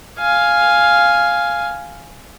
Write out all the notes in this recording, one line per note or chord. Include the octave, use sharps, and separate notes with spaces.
F5 G#5